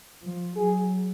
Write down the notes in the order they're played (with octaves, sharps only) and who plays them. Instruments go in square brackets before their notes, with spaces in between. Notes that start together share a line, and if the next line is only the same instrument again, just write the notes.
[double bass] F3
[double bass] F#3 [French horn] G#4